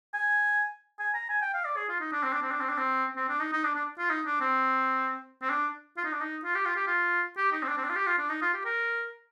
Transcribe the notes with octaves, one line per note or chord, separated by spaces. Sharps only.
G#5
G#5
A#5
G#5
G5
F5
D5
G#4
F4
D#4
D4
C4
D4
C4
D4
C4
D4
C4
C4
D4
D#4
D#4
D4
D4
F4
D#4
D4
C4
C4
D4
F4
D#4
D4
D#4
F4
G4
F4
G4
F4
G4
D#4
C4
D4
C4
D4
F4
G4
F4
D4
D#4
F4
G4
A#4